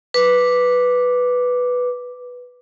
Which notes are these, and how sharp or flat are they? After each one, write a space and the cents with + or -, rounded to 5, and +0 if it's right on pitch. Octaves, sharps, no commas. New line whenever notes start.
B4 +0 D6 +0